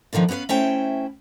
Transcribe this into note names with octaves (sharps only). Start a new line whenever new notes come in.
A#2 D3 D#3 F3 B3
B3 C#4 E4 B4 F5
A3 C#4 E4 C5 G5